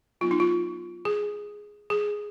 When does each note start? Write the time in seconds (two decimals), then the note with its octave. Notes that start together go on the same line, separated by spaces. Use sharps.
0.21 F#3 B3 D#4 F4
0.31 D#4
0.40 F4
1.05 G#4
1.90 G#4